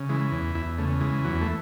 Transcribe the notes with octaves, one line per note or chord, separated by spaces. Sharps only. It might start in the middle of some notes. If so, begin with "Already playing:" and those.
Already playing: C#3
E3 G#3
E2
E2 E4
C#3 A3
E3 G#3
E2 F#3
A3